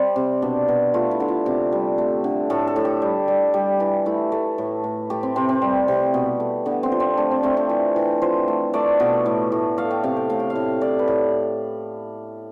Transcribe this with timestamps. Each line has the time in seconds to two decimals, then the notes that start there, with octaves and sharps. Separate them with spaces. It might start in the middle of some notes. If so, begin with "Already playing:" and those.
Already playing: G3 C4 D5
0.16 C3
0.42 B2 D4
0.68 B2
0.94 A3 F4
1.11 E4
1.20 D3
1.28 F4
1.46 C3 G4
1.72 G3
1.98 A3
2.24 D3
2.50 A2 A4
2.67 A4
2.76 A2
2.85 G4
3.02 G3
3.28 G3
3.54 G3
3.80 E3
4.06 A3 E4
4.32 A3
4.58 A2
4.84 A2
5.10 A3 G4
5.23 C4
5.36 C3 C4
5.49 C4
5.62 G3
5.88 C3
6.14 B2
6.40 A3
6.66 D3 B3
6.83 C4
6.92 F3
7.00 C4
7.17 A3 D4
7.31 C4
7.43 A3 C4
7.57 D4
7.69 E3
7.96 E3
8.22 F3 C5
8.48 A3
8.73 A3 D5
9.00 B2
9.26 A2
9.52 A2
9.78 A3 F5
9.91 G5
10.03 C3 F5
10.17 G5
10.30 A2 F5
10.39 G5
10.50 F5
10.55 A2
10.81 A2 D5
10.99 B4
11.07 A2